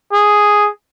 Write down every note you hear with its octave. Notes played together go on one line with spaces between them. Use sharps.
G#4